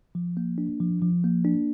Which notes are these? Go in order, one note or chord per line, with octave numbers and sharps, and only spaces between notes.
F3
A#3
D4
F3
F3
A#3
D4